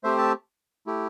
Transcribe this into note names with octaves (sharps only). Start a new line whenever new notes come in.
A3 C4 G4 C5 E5
E5 A5
A3 E4 G4